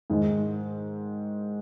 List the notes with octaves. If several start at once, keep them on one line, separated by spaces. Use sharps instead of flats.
G#2 D#3 G#3